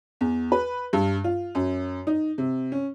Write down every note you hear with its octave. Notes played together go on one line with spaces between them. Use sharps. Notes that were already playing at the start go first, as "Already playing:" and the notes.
E2
B4
G2
F4
F#2
D#4
C3
C#4